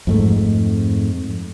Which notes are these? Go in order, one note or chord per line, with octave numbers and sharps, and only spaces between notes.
F2 G#2 A3